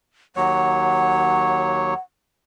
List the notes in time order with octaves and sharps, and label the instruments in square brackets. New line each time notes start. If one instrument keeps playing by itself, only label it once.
[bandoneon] D#2 F#3 C#5 [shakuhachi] F#5